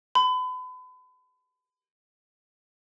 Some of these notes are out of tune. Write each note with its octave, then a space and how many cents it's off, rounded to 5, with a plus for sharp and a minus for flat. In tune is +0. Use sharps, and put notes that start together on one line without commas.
B5 +35